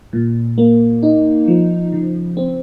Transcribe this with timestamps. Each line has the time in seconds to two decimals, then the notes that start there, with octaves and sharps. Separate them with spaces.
0.13 A#2
0.58 A#3
1.03 D#4
1.48 F3
1.92 C#3
2.37 C4